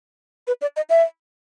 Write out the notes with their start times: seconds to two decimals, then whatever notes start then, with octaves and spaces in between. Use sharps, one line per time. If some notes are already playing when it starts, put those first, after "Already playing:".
0.47 B4
0.61 D5
0.76 D#5
0.90 E5